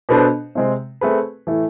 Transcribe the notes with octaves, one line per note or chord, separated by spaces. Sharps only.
B2 B3 D4 A4 C5
C3 G#3 C4
A3 C4 G#4 B4
A2 E3 A3